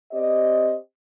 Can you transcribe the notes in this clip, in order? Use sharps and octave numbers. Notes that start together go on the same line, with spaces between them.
C4 G4 C5 D5 D#5